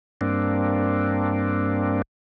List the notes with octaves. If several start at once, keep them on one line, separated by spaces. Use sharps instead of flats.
G2 A#3 C4 D4